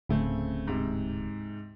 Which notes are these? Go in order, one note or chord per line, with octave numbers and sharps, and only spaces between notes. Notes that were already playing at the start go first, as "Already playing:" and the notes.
D1 C#3 A3 C4
G#2 C3